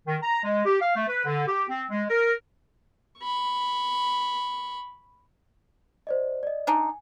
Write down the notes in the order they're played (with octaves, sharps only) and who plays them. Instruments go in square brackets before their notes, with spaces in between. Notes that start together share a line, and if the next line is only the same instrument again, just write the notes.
[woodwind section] D#3
A#5
G#3
G4
F5
A3
B4
D3
G4
C4
G#3
A#4
[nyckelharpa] B5 C#6
[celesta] C5 D5 D#5
D5 D#5
[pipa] D4 D#4 [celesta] G#5